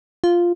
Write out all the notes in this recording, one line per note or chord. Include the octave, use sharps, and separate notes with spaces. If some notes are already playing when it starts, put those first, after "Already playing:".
F4